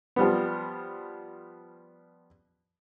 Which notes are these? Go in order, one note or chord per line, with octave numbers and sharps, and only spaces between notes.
F3 G3 B3